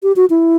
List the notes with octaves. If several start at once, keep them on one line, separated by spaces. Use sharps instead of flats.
G4
F#4
E4